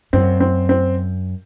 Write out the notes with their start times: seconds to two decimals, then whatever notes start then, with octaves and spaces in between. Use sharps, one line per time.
0.13 F#2 C4
0.40 C4
0.69 C4